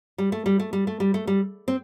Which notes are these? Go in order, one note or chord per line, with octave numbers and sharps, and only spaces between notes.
G3
A3
G3
A3
G3
A3
G3
A3
G3
C4